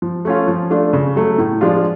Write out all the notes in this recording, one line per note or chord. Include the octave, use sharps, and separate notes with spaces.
F3
A3 C#4 F4
F3
A3 D4 F4
C#3
F#3 A3
A2
F3 G#3 D4 F4